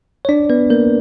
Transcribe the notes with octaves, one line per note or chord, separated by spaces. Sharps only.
C#5
D4 D5
B3 B4
A#3 A#4